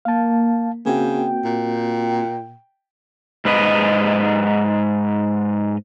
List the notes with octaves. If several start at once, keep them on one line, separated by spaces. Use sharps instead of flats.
A#3 F5 A5
C#3 A#3 C4 F#4 G5
A#2
G#2 B4 D#5